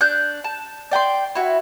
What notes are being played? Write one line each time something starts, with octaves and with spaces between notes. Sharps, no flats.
D4 F#6 G6
A5
D5 G5 A#5 C6
E4 F#4